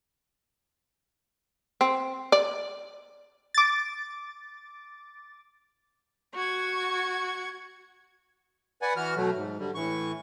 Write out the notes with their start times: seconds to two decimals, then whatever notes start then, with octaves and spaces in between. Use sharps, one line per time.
1.81 C4
2.32 D5
3.54 D6 A6
6.35 F#4 C#6 G#6
8.82 B4 D5 F#5 G#5
8.96 E3 F#4 F6
9.17 B2 F#3 A3
9.36 G#2
9.59 D3 G3
9.75 A2 E3 C#6